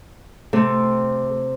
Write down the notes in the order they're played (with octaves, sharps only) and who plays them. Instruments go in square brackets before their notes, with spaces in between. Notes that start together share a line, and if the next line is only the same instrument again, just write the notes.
[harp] C3 C4 [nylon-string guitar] A3